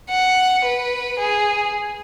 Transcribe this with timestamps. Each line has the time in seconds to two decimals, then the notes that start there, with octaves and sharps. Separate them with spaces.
0.10 F#5
0.65 B4
1.19 G#4